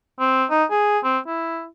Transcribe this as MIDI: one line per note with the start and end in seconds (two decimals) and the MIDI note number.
0.20 0.45 60
0.51 0.65 63
0.71 0.99 68
1.04 1.19 60
1.27 1.66 64